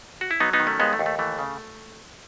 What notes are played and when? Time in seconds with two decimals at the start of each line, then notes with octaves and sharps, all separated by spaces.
0.21 F#4
0.31 E4
0.40 F#3 B3 D#4
0.53 B3 D#4
0.60 D#3
0.67 A3 C#4
0.79 D#2 G#3 B3
0.93 A3
0.99 D#2
1.06 A3
1.19 E3 A3
1.39 C#3